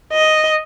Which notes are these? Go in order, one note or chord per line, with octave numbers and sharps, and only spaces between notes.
D#5